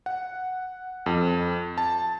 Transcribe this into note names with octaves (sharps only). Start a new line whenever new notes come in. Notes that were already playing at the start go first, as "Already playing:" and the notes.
F#5
F2
A5